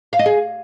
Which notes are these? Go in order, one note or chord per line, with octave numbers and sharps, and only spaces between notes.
F5
D#5
G#4